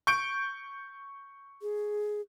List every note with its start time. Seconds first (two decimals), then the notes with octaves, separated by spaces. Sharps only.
0.07 C#6 G6 D7
1.62 G#4